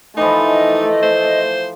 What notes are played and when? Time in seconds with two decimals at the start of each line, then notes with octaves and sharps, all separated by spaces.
0.17 E3 F3 A3 D#4 D#5
1.03 C5